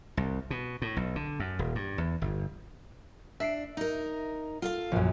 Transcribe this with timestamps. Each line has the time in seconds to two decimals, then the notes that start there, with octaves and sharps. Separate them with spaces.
0.17 C2
0.50 B2
0.82 A2
0.96 B1
1.16 D3
1.40 F#2
1.59 D#1
1.75 G2
1.98 E2
2.22 G1
3.40 D4 E5 C7 D7
3.77 D#4 A#4
4.62 F4 A4 F5
4.92 A#1 F#2